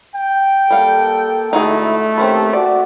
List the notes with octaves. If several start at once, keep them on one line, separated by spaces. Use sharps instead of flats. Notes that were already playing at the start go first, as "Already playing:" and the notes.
G5
G3 A#3 A4 F5 F#5
G#2 D3 A3 D#4 E4 F#4 G#4
D#3 A#3 C4 C#4 G4 B4
F#4 D5